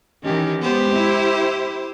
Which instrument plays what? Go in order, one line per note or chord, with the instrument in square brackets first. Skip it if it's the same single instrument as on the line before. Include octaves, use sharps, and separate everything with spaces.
[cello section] D#3 E3 [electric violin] C#4 G4
[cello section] G#3 B3 [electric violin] G4 C5
[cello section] E4